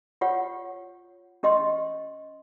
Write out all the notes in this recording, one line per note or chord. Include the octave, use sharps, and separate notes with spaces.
F4 G4 C#5 F#5
C#4 G4 D#5 C6